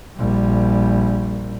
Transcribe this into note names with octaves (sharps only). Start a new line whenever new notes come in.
A#1 G3